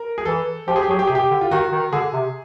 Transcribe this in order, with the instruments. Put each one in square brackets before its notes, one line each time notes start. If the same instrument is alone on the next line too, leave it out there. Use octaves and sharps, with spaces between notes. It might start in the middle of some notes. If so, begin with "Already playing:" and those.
Already playing: [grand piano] A#4
G#4
[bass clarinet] E3 [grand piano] A4
[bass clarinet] F3 [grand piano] G4
[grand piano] G#4
G4
[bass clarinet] F#3 [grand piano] G#4
[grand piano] G4
[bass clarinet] C3 [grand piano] G#4
[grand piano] G4
[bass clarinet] D3
[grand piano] F4
[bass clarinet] D#3 [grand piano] F#4
[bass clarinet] D#3
[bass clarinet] D3 [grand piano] G#4
[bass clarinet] C3